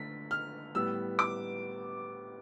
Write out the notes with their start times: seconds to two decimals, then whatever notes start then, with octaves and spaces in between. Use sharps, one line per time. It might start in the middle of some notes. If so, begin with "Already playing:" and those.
Already playing: D3 A3 B6
0.31 F6
0.75 A2 G3 B3 E6
1.19 D6